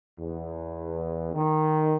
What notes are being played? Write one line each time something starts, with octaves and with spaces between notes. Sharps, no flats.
E2
D#3